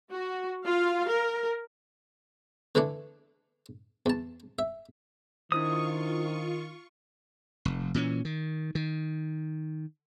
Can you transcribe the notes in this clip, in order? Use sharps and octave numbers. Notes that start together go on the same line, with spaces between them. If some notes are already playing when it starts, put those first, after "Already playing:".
F#4
F4 F5
A#4
D3 E3 A3 D4
E2 A5
E5
D#3 D4 E4 F4 C5 C#6 D#6
F1
A#2 E3 C#4
D#3
D#3